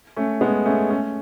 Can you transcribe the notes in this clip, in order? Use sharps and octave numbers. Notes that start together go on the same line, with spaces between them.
A3 C#4
G#3 B3
A3 C#4
A3 C#4